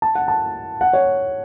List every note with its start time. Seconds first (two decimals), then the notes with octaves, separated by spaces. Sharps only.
0.02 A5
0.15 F#5
0.28 A5
0.81 F#5
0.93 C#5